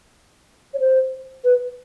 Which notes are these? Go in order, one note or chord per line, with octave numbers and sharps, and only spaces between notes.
C#5
C5
B4